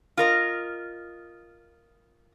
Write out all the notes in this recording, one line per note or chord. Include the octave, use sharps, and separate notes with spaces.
F4 A#4 D#5